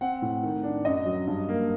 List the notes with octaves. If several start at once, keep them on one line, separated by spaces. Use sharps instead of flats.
C4 F#5
A2
D#3
D4
F#2 D#5
F#3
G2
A#3